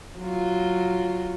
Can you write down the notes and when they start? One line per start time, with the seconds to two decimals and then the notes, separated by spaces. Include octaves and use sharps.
0.18 F#3 F4